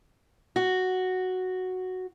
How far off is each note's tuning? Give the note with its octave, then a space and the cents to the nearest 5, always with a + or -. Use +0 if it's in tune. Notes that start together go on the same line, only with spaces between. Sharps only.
F#4 +0